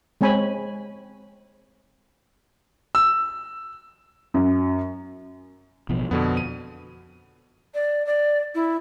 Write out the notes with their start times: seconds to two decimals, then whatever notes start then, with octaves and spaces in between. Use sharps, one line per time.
0.21 G#3 C4 C#5 G#5 B5
2.95 E6
4.34 F#2
5.89 A1 B2 F3
6.11 F2 B2 D3 B3
6.37 D#7
7.74 D5
8.06 D5
8.55 E4